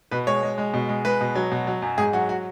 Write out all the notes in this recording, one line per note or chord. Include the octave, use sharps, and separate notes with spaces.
B2 B4
G#3 C#5
G#3
G#3
B2
G#3
G#3 B4
B2
F#3
B2
F#3
F#2
G#2 G#4
F#3 F#4
F#4